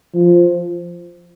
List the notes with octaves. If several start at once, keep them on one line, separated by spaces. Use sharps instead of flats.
F3